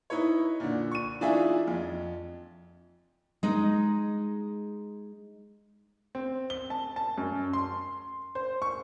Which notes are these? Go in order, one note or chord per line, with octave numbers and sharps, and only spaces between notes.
D#4 E4 B4 C#5
A#2 D3
C#6 D#7
E3 D4 D#4 F4 G#4 E5
F2
G#3 D#4
C4
G7
A5
A5
F#2
C6
C5
C#6